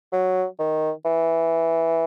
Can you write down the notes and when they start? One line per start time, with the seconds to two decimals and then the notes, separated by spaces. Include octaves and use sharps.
0.12 F#3
0.59 D#3
1.05 E3